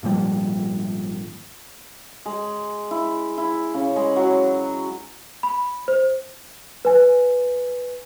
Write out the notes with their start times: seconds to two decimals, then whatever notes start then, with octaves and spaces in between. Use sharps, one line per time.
0.03 G#1 A#2 F3 G3
2.26 G#3
2.91 E4
3.38 E4
3.74 C#3
3.96 G#3
4.16 F#3
5.43 B5
5.88 C5
6.85 B4 G#5